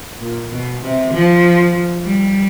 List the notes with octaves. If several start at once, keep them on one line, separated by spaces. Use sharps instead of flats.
A#2
B2
C3
F3
G3